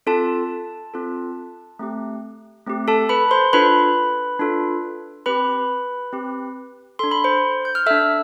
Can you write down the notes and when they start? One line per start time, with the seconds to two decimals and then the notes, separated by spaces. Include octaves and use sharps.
0.07 C4 F4 A4 A5
0.94 C4 F4 A4
1.79 A3 C4 G4
2.67 A3 C4 G4
2.88 A4 A5
3.09 B4 B5
3.31 C5 C6
3.53 D4 F4 A4 B4 B5
4.39 D4 F4 A4
5.26 C4 G4 B4 B5
6.13 C4 G4
6.99 D4 A4 C6
7.11 B5
7.24 C5 C6
7.65 G6
7.75 F6
7.86 D4 A4 E5 E6